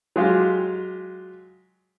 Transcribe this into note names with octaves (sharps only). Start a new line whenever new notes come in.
F#3 G#3 F4 G4